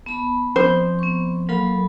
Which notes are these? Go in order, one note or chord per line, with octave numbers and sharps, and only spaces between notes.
B3 A5 B5
F2 C5
B3 C#6
F#3 A#3 A4 B5